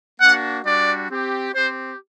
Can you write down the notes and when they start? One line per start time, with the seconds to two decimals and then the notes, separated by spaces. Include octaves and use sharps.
0.20 A#3 D4 F#4 F#5
0.65 G3 D4 F#4 D5
1.10 C4 G4
1.53 C4 G4 C5